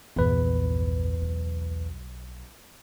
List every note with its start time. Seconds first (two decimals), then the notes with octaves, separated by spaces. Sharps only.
0.16 A#1 E2 G2 B4
1.22 B1